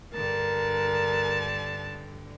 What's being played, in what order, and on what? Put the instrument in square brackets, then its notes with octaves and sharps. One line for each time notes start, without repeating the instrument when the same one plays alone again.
[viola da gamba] G2 D3 [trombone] A#4 [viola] A5